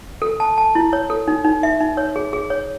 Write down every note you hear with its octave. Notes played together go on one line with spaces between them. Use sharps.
A4
A5
A5
E4
C#5
A4
D#4
D#4
E5
D#4
C#5
G#4
G#4
C#5